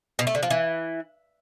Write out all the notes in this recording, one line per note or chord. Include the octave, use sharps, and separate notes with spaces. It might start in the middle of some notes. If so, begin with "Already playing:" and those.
B2
A3
D3
F3
E3